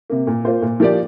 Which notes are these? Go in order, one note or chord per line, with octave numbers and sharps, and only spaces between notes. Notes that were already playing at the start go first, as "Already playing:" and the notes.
C3 A#3
A#2
A#3 F4 C5
A#2
F3 A#3 G4 D5